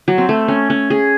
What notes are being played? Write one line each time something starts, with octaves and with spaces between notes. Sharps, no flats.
F#3
C4
A3
C#4
C#4
G#4